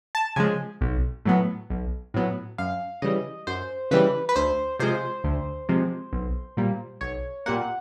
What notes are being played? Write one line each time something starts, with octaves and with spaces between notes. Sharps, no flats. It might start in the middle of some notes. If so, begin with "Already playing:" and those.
A5
C#3 F3 G#3 G#5
B1
A2 F#3 B3
B1
A2 F#3 B3
F#2 F5
C#3 E3 G3 D#5
F#2 C5
C#3 E3 G3 B4
B4
D2 C5
C3 F3 G#3 C5
D2
C3 F3 G#3
B1
A#2 G3 A#3
B1 C#5
A#2 G3 A#3 F#5